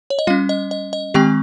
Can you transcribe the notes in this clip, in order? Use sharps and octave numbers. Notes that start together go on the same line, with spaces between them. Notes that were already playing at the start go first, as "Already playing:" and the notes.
C#5
D#5
G3 C#4 F4 F5
D#5
D#5
D#5
D#3 G#3 C4 G4 G5